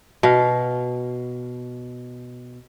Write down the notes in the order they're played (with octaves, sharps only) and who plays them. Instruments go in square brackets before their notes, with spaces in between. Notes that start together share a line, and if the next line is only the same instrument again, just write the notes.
[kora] B2 F5